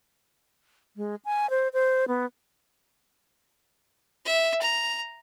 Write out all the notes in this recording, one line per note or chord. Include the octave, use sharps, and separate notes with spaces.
G#3
G#5
C5
C5
B3
E5
A#5